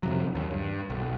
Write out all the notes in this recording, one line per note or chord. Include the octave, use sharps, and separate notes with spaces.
F2 C3 F#3
D#2
G2
B1